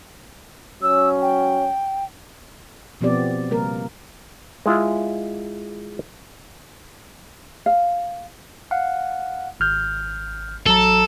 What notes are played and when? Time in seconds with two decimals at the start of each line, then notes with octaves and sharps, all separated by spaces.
0.82 F#3 C#4 E6
1.22 G5
3.01 B2 F3 B3 C4 G4 D5
3.50 C#3 G3 A#3 A#4
4.66 G#3 E4 F4
7.66 F5
8.71 F5 F#5
9.60 G#1 F6 G6
10.66 A1 F#3 A4 A#5